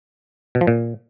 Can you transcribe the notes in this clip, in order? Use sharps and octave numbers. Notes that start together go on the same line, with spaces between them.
B2
F3
A#2